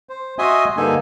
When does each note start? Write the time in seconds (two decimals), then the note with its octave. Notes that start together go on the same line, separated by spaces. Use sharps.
0.09 C5
0.39 F#4 D#5 E5 G#5 C6 D#6
0.77 G2 D3 A#3 D#4 A4 G#5